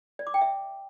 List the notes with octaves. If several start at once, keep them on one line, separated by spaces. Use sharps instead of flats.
D5
D6
G5
E5